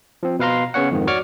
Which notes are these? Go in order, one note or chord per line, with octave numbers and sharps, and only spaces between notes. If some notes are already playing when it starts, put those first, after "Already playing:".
F3 C4
B2 B4 F5 A#5 C6
C#3 B3 C#4 C#5 F#5
F2 G#2 D#3
F#4 C#5 D5 C#6 D6 F6